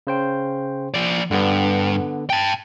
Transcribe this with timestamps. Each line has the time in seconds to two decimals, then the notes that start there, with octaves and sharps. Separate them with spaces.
0.07 C#3 C5 G5
0.94 F3 D5
1.31 G2 D3 B3
2.30 G5 A5